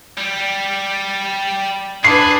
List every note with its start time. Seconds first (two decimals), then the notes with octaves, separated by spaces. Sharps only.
0.18 G3
2.04 D4 G#4 B4 C7